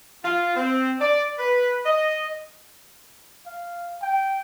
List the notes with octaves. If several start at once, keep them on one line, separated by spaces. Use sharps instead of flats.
F4
C4
D5
B4
D#5
F5
G5